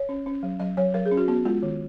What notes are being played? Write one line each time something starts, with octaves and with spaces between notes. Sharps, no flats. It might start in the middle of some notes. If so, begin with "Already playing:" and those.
Already playing: C#5
C#4
C#4
F#3
F#3 D#5
F#3 C#5
F#3 A#4
G#4
C#4
F#4
B3 F#4
G#3 F4
D#3